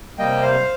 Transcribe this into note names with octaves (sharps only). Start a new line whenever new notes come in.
C3 G3 A#3 D#5 G5
C5 F5